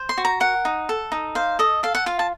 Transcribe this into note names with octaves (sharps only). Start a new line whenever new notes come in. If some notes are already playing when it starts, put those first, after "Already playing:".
Already playing: C5
C6
F#4
A#5
A#4 F#5
D#4
A4
D#4
C5 F5
A4 D#5
A4 F5
F#5
F4 F5
A5